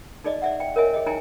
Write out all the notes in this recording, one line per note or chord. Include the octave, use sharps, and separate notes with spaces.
D#4 G#4 D5 D#5
D5 E5 F#5
G5
A#4 C#5 D#5 E5 G#5
G#4 D#5
D#4 E4 G5 G#5 A#5